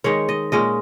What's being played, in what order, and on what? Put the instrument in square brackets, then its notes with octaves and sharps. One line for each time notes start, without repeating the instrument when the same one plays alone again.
[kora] D#3 G#3 D#4 C#5
D#5
A#2 G#3 C#4 D#5